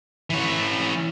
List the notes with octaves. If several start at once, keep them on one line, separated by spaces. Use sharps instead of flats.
E3 C#5